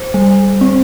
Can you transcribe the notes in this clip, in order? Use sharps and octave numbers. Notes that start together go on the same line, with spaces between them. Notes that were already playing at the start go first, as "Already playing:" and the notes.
Already playing: C5
G3
C4